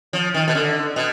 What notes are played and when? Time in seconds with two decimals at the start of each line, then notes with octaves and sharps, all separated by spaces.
0.13 F3
0.34 D#3
0.48 B2
0.55 D3
0.96 B2